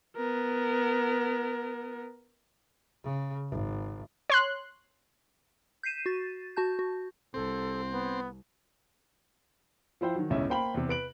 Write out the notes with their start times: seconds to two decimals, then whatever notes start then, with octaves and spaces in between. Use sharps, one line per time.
0.16 B3 A#4
3.04 C#3
3.50 G#1
4.30 C#5 C6 F#6
5.83 G6 B6 C7 D#7 E7
6.06 F#4 A6
6.56 F#4 A5 G6
6.79 F#4
7.34 C2 C4 A4
7.91 B3
10.01 F3 E4 C5 G5
10.16 D#3 F#3
10.30 G1 C#2 A2 C#4 E5
10.49 A#3 C5 G5 B5 F#7
10.74 E2 C3
10.89 B4 D7 F#7